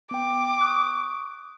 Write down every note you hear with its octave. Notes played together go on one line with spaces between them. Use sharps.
B3 G5 D6
C#6 D#6 F#6